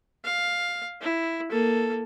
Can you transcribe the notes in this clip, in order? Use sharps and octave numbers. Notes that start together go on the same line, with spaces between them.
F5
E4
A#3 A4